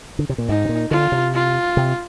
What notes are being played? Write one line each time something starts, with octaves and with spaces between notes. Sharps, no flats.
D3
C3
A#2
G#2 D#4
C3
A#2
D3 F4
C3
F4
C3